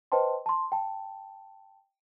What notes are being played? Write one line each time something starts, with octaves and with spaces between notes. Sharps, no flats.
B4 C5 D#5 G5 A5 C6
A5 C6
G5 A5